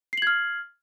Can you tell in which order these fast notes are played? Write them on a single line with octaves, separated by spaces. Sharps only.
C7 F#7 G#6 F6